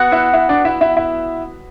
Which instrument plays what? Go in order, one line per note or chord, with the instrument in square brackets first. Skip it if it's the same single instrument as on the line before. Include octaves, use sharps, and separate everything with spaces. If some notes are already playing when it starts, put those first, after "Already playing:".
Already playing: [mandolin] B3 F#4 F#5
[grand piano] E4 E5
E4 E5
D4 D5
E4 E5
E4 E5
E4 E5